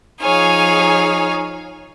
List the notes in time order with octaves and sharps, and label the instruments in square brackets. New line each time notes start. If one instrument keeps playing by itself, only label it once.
[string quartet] F3 D#4 G#4 C#5 F5 G#5